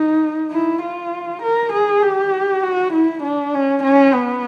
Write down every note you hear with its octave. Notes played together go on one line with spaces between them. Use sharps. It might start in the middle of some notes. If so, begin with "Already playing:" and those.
Already playing: D#4
E4
F4
A#4
G#4
G4
F#4
E4
D4
C#4
C#4
B3